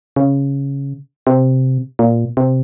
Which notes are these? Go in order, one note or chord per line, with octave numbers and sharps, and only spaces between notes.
C#3
C3
A#2
C3